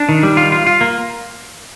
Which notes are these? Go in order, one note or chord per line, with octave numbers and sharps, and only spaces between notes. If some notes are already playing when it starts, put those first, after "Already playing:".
Already playing: D4
D#3
G3
F4
F4
F4
A#3